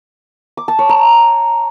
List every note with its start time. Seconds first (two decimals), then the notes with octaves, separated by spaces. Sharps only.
0.57 D6
0.68 A5
0.79 C#5
0.89 A#5